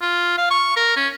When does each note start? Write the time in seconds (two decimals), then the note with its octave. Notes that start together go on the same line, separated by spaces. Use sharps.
0.01 F4
0.38 F5
0.51 C#6
0.77 A#4
0.96 C#4